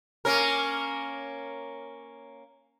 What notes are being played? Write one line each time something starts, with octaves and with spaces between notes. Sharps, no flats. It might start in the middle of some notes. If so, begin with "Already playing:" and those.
A#3 C#4 A#4